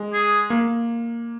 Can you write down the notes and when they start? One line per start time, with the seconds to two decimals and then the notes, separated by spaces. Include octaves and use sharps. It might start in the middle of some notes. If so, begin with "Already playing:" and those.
Already playing: G#3
0.13 G#4
0.50 A#3